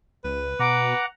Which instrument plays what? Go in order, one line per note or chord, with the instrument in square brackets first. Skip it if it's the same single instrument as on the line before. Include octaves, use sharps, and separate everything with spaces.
[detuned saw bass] C#2 [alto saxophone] B4
[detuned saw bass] B2 [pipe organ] F#5 A#5 [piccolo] D6